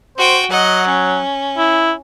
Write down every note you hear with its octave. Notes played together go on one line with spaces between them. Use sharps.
F#4 C5 G5
F#3 D#5 F#5
C#4
E4